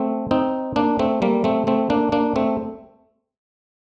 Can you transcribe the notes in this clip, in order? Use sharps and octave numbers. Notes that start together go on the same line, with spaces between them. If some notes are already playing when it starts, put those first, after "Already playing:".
Already playing: A3 C4
C4 D#4
A#3 D4
A3 C4
G3 A#3
A3 C4
A3 C4
A#3 D4
A#3 D4
A3 C4